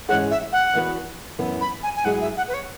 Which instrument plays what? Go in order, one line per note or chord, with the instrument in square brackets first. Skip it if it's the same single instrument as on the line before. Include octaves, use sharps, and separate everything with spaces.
[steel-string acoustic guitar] G#2 E3 C#4 G#4 C#5 [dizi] F#5
[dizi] E5
F#5
[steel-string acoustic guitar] E2 E3 B3 F#4 B4
F#2 E3 B3
[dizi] B5
G#5
G#5
[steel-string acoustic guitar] G#2 F#3 E4 G#4 [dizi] F#5
[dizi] E5
F#5
B4
C#5